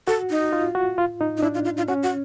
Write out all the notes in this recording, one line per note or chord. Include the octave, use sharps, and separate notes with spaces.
F#4 A4
D#4
F4
F#4
F4
D#4
D#4
D4 E4
F4
F4
F4
C#4 F#4
F#4